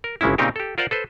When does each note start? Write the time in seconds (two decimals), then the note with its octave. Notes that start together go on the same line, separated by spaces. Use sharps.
0.04 A#4
0.21 G1 C#3 G#3 C#4 E4
0.38 A#2 C#3 C4 D#4 G4 A#4
0.56 G4 A4
0.78 F4 A#4 C5 D5 F#5
0.91 A4 B4 C5